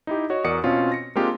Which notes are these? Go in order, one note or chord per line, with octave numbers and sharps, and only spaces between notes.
D#4 E4 G4
F#4 C#5 D#5
E2 F#4 A#4 D5 D#6 C#7
B2 C4 C#4 F4
A#6 C#7
G#3 A#3 C4 D4 F4 G4